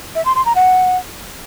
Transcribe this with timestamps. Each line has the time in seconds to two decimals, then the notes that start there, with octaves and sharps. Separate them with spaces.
0.15 E5
0.25 C6
0.35 C6
0.45 A#5
0.55 F#5